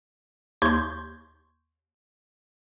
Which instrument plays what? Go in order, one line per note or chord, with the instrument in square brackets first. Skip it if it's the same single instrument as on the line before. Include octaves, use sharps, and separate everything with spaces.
[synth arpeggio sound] D#2 C6 C#6 G6 G#6